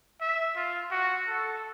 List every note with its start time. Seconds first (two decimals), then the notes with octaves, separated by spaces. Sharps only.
0.21 E5
0.56 F4
0.91 F#4
1.27 A4